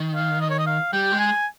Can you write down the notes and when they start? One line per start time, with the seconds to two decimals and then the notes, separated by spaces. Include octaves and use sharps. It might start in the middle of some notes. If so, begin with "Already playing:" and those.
Already playing: D#3
0.15 F5
0.41 D#5
0.50 C#5
0.59 D#5
0.67 F5
0.93 G3 G5
1.12 G#3
1.19 G#5